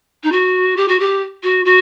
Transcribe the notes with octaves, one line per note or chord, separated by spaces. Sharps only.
D#4
F#4
G4
F#4
G4
F#4
F#4